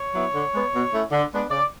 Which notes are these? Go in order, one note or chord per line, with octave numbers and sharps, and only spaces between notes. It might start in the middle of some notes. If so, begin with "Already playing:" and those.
Already playing: C#5
F#3 B3 E4
D3
G#3 B3
B2
A3 C#4 E4
D3
G#3 B3 D4
C#3 D5